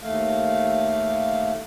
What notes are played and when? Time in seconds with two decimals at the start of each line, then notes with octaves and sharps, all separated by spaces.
0.01 D#2 A3 F5